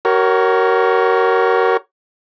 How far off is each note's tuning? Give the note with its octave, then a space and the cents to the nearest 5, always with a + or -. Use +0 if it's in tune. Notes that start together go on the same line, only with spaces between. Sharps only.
F#4 +40 A#4 +0 C#5 +0